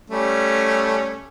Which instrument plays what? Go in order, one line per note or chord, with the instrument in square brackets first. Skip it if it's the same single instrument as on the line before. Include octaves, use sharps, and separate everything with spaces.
[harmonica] G3 A3 C#4